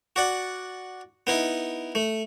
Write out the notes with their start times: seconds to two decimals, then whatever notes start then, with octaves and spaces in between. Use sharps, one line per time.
0.16 F#4 D5 F#5
1.27 B3 D#4 E4
1.95 A3